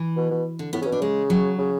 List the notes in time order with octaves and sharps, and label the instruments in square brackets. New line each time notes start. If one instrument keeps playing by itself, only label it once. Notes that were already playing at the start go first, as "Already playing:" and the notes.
Already playing: [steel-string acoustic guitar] E3
[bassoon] B2
B2
[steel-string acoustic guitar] D3
[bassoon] A2 [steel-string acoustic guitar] B3
[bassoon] C#3 [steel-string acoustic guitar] C#4
[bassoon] B2
[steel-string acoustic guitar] D4
[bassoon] C#3 [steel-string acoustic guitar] G#3
[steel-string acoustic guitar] F#3
[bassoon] C#3